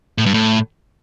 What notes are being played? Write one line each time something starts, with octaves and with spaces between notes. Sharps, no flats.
A2
G2
A2